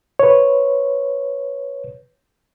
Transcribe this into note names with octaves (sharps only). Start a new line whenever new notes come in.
B4 C#5